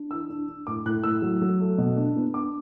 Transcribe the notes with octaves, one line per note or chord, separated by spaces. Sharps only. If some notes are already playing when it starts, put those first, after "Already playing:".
Already playing: D4
E3 E6
D4
D4
A2 D6
A2 F#6
A2 E6
F#3
F#3
A3
B2
D4
B3
D4 D6